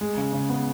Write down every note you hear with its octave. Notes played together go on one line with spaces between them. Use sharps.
G#3
C#3
C#3
B3